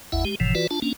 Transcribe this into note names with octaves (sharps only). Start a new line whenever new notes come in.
G#1 E2 E4 E5 F#5
G#3 G4
F#1 A2 C3 E3 F3
E3 F4 F#4 B4 D5
D4 F4 A5
A#3 C#4 D4